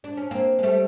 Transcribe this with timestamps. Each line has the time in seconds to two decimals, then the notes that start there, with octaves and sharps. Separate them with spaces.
0.04 D4
0.17 C#4
0.31 A#3 C4
0.59 G#3
0.63 G3 A3